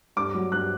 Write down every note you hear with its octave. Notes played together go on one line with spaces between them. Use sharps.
G2 D6
F#3
G2 F#6